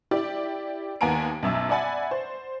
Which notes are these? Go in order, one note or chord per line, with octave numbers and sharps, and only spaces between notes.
E4 G4 D5
D#2 A#3 B3 G#5 A#5 D7
B1 F#2 E5 E6
D5 E5 F#5 G#5 B5 A6
C5